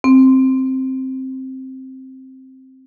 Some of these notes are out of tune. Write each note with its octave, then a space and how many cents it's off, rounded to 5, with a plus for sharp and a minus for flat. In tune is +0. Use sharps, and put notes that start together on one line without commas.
C4 +5